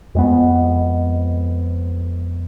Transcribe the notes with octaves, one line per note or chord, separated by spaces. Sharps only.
F2 G#3 B3